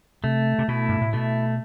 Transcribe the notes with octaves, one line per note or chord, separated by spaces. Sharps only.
C3 A3
C3
B2 E4
G2
A2
B2 A3